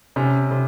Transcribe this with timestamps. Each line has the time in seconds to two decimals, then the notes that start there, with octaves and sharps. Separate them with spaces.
0.16 C3 C#4
0.51 C3